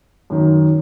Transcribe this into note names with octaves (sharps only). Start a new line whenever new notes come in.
F#2 D#3